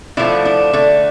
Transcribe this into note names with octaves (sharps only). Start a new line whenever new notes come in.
D3 F3 A3 E4
D4
D3 A3